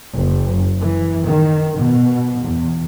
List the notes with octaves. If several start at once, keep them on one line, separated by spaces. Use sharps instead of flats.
F#1
E3
D#3
B2
E2